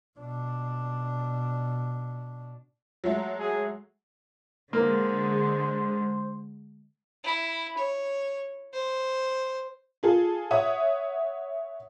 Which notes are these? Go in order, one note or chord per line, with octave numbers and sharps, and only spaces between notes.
B2 D4
F#3 G#3 A3
G#4
D3 G#3 A#3 C5
E4
C#5
C5
F4 G#4 A4
C#5 E5 F#5 D#6